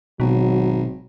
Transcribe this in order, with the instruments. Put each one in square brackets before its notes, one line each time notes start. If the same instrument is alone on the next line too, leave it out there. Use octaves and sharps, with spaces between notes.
[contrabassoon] G#1 [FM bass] B2 [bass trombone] F#3